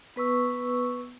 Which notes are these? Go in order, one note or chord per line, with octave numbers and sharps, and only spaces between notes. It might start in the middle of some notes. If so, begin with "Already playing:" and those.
B3 B4 C#6 E6